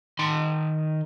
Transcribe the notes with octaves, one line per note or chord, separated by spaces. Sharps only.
D#3 C6